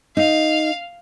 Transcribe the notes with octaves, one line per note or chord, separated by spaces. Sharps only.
D#4 F5